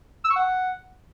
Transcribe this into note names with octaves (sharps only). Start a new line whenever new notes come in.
E6
C#6
F#5